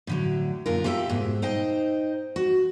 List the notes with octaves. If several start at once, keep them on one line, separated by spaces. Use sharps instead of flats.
A2 D3 F#3
F#2 A#2 D3 F4 A#4
F4 G4 A4 C#5 E5 G5
G#2 B2
D#4 C5 D#5 G5
F#4